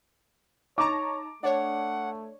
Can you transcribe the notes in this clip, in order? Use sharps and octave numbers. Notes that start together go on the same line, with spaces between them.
D#4 C#5 A5 A#5 D6
A3 D4 C#5 F#5